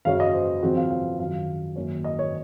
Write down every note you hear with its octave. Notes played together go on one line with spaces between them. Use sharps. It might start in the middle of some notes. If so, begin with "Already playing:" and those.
F#2 C#3 F#3 C#4 F5
D#5
C5
C#3 F3 C4 F#4
F5
F5
F#2 D#3 F#3 F5
F#2 D#3 A#3 C#4
D#5
C#5